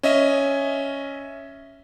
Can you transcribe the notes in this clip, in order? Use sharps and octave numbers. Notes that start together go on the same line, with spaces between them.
C#4 D#5 E5